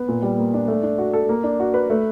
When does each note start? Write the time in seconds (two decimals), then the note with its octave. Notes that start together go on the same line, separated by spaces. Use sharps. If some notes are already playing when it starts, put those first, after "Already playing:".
Already playing: B3
0.08 A#2
0.22 G3
0.38 A#3
0.54 D4
0.68 A3
0.83 D4
0.98 F#4
1.13 A4
1.29 A#3
1.44 D4
1.60 F#4
1.74 B4
1.90 A3